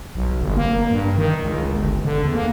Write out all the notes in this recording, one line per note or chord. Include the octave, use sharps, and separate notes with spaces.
B1
G1
A#3
G2
D#3
C#2
G1
D3
E2
A#3